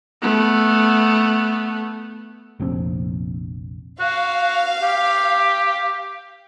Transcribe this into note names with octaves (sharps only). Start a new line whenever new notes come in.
A3 B3
F1 A#1 F3 C4
F#4 F5
G4